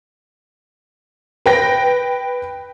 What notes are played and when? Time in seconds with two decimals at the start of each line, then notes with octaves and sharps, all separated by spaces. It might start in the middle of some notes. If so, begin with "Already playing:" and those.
1.46 B4 G5 A#6